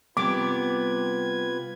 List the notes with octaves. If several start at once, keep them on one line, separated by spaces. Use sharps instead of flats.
C3 G3 B3 F4 B4 D6 G#6